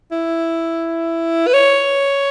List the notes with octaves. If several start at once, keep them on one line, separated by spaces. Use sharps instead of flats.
E4
B4
C#5